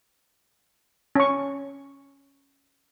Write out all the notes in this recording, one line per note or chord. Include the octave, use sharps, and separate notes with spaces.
C#4 C#6